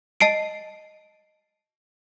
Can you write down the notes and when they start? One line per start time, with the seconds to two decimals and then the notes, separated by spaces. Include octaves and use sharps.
0.21 D#5 A5 C7 D7